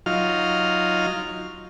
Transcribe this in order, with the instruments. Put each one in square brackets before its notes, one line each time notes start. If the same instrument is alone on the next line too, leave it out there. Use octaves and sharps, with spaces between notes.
[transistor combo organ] F#3 D#4 F4 F6